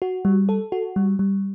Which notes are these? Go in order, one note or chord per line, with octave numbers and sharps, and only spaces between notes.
F#4
G3
A4
F#4
G3
G3